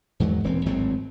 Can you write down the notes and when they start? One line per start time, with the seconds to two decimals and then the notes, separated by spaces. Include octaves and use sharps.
0.20 E2 G#2 D#3 F#3
0.44 D#1 E3 C4
0.66 G#1 A2 F#3 C4